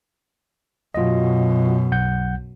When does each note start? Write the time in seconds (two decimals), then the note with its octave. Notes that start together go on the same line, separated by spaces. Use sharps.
0.94 F#2 B2 F4 D#5
1.92 B1 F#5 G6